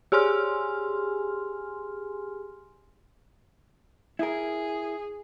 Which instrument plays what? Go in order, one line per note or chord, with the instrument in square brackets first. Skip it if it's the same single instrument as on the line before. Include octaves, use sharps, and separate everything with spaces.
[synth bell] G4 G#4 G#5 C6 F6
[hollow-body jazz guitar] E4 A#4 [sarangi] G#4